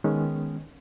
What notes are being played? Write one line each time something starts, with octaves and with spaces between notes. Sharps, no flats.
D#3 G#3 B3 C#4